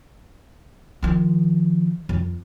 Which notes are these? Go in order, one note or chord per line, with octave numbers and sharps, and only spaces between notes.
D#3 F3
F2